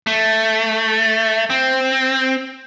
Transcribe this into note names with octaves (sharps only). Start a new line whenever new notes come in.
A3
C4